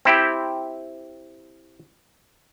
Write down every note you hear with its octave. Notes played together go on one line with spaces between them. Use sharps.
C4 E4 G4